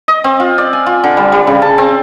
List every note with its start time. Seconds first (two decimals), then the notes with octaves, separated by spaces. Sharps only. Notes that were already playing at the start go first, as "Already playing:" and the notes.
0.08 D#5
0.24 C4
0.40 F4
0.58 D5
0.73 G#5
0.86 F4
1.04 D3
1.17 G3
1.32 G3
1.47 C#3
1.62 A5
1.78 C4